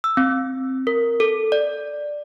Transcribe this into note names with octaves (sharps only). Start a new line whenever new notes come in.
E6
C4
A#4
A4
D5